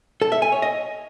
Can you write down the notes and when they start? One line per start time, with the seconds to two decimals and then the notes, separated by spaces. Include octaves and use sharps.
0.22 A4
0.32 E5
0.42 G#5
0.52 C#5
0.62 D#5